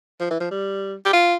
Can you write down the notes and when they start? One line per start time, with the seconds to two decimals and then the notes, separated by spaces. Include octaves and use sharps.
0.20 F3
0.30 E3
0.40 F3
0.51 G3
1.06 G4
1.13 F4